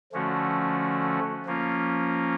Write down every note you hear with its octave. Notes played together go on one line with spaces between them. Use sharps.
D3 F3 A3 C#4 F#4
F3 A#3 C#4 F4